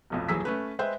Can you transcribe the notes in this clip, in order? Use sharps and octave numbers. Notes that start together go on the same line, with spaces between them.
F1 B1 F2
D#1 E3 F#3 G#4 E6 B6
A3 C#4 B4
G#3 B4 C5 E5 G5